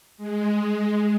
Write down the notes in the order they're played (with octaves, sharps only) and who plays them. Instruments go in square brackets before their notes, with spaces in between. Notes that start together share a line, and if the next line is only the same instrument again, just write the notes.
[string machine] G#3